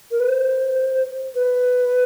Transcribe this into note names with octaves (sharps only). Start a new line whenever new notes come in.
A#4
B4
C5
B4